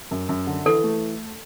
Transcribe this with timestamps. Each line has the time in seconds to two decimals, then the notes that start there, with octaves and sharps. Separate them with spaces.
0.11 F#2
0.29 F#2
0.47 D3
0.66 E3 A4
0.84 A3